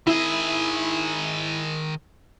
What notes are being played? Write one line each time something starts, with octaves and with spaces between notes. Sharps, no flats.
D#3 E4 G#4